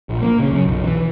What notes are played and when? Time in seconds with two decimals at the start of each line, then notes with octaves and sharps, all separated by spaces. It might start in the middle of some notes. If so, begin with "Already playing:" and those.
0.09 A#1
0.22 A#3
0.39 C#3
0.51 F#2
0.68 B1
0.83 E3
0.97 E3